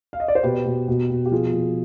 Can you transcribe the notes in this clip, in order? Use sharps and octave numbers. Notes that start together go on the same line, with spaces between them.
F5
D#5
D5
C5
B2 G4 B4
B2
B2
B2
G4
F3 F4 G#4
F3